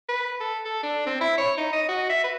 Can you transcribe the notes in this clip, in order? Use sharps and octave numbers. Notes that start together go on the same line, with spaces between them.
B4
A4
A4
D4
C4
E4
C#5
D#4
D#5
F#4
E5
B4